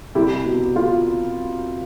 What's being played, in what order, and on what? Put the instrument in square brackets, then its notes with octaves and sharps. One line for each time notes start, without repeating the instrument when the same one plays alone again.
[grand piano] C2 E4 G4
B2
F4